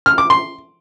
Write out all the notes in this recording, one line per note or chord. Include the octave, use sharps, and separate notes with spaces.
F6
D6
C6